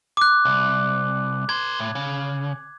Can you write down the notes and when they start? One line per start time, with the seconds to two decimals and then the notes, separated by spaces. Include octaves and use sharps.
0.17 D6 F#6
0.45 C2
1.49 A#4 C5 G#6
1.79 A2
1.95 C#3